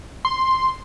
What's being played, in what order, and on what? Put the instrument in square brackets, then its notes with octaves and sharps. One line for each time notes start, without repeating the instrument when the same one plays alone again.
[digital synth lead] C6